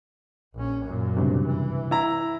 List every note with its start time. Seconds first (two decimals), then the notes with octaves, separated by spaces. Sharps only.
0.54 A#1 C#4
0.84 F#2 A#2
1.17 C#2 G2 C3
1.47 E3
1.91 E4 A#5